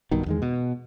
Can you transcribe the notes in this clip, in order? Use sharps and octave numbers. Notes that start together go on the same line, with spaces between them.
B1 G2 B2 D#3
E2 D#3 G#3
B2